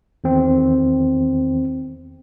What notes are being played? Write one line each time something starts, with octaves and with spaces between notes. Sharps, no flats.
E2 D#3 C4